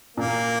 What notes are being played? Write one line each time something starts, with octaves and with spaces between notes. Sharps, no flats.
A#2 A#3